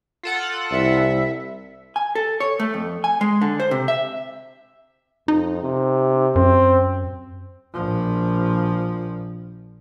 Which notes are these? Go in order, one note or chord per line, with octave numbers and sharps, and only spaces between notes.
F4 A4 F#5
C2 E4 E5
G#5
A4
C#5
A3
F2
G#5
G#3
D3
C5
C3
E5
F2 D#4
C3
F#2 C4
A#1 F3